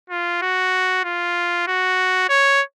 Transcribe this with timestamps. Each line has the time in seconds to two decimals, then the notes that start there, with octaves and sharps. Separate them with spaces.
0.10 F4
0.42 F#4
1.04 F4
1.68 F#4
2.29 C#5